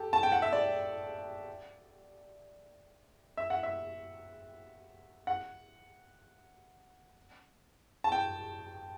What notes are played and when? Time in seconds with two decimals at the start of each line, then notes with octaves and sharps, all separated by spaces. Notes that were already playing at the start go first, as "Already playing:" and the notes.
Already playing: G4 A4
0.13 A5
0.23 G5
0.32 F#5
0.42 E5
0.53 D5
3.37 E5
3.50 F#5
3.63 E5
5.27 F#5
8.04 A5
8.12 G5